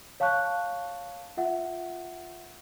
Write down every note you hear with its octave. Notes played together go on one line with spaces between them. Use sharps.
C#5 F5 A5 C#6 F#6 G6
F4 E5 F#5